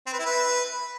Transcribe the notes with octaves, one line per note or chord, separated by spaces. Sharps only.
C4
B4
E4
B4